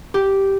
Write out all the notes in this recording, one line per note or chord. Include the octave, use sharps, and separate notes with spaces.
G4